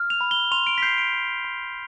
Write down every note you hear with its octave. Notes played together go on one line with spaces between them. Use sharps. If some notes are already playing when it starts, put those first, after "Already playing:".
Already playing: F6
F7
B5
G7
C6 F7
D7
B6
G6 C7
D7
C6
C6